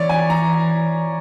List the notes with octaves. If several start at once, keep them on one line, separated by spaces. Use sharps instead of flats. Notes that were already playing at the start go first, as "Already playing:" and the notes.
Already playing: E3 C#5 D5
G#5
A#5